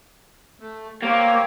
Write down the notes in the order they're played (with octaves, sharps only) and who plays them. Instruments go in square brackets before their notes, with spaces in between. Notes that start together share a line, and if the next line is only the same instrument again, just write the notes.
[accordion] A3
[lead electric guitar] A#3 [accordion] C4 G4 C#5